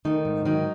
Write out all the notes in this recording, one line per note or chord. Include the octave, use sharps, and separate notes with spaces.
D#3 A3 D#4
G#2
D#3 F#3 D#4